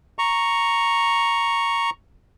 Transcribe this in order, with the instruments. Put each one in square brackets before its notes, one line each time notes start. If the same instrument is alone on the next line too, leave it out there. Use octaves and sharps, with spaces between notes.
[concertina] A#5 C#6